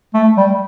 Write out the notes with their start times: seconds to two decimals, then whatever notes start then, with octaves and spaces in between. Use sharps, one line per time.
0.14 A3
0.37 G3